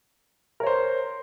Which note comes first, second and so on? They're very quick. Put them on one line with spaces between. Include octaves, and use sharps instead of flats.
A#4 C#5 C5